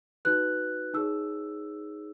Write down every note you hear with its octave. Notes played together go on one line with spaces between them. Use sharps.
D#4 F#4 B4 F#6
D#4 G#4 C#5 E6